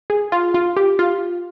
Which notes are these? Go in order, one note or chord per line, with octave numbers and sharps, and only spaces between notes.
G#4
F4
F4
G4
F4